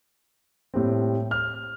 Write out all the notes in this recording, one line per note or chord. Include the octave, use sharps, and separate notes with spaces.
A2 G3 C4
F6